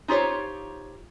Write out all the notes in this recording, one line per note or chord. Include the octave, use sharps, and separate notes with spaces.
D#4 F4 G4 C5 C#5